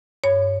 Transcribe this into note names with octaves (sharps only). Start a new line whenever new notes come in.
G2 C#5